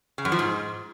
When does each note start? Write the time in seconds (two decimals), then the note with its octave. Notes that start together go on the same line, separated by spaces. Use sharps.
0.18 C#3
0.25 F#2
0.32 F3
0.39 G#2